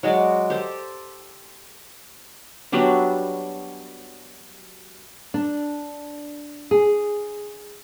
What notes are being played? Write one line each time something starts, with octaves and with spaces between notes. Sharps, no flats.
F#3 G#3 F#4 D5
G4 A4 C5
F#3 G3 B3 D4
D4
G#4